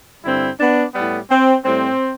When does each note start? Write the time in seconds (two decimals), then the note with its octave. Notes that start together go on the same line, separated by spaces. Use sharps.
0.24 G2 D3 G3 C4 E4
0.60 B3 D4
0.95 A2 G3 B3
1.30 C4
1.65 A2 G3 C4